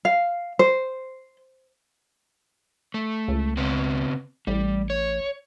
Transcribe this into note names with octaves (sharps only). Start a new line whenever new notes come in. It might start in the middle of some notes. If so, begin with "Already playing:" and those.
F5
C5
A3
C#2
C#3 B3 C4
A1 G3
C#5